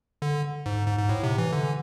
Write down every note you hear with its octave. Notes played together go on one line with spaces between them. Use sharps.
D3
G#2
G#2
G#2
A2
C3
E3
D3